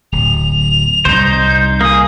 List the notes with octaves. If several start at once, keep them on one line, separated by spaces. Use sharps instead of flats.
D1 F7
C2 C3 G3 D#4 C5 G6
A#3 G#4 D#6